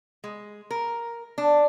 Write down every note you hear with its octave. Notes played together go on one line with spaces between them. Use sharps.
G#3
A#4
D4